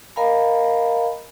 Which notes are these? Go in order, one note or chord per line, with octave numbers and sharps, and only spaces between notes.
A#4 D#5 F5 G#5 A#5 B5